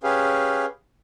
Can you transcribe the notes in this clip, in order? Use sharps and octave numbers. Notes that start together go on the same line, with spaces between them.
C#4 G4 G#4 B4 F5